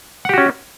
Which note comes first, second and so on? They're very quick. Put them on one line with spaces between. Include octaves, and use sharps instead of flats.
F#5 G4 F#4 C#4